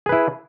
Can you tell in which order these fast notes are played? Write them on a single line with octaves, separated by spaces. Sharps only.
G#4 B4 E4